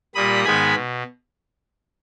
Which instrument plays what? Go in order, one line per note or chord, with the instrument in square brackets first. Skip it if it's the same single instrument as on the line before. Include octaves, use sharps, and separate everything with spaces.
[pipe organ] A#2 G3 A#3 B5 D#6
G#2 D#3 G#3 B3 G#5 B5
B2